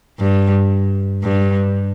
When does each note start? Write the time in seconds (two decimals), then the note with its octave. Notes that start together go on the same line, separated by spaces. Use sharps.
0.20 G2
1.23 G2